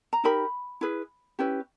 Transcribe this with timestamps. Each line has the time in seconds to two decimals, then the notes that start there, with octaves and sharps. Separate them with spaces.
0.13 A#5
0.24 D#4 G4 A#4 B5
0.81 E4 G#4 B4
1.39 C#4 E4 G4 B4